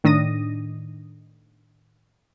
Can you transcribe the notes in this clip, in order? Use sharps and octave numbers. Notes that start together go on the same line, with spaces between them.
A2 D#3 D4 D#6 A#6 D#7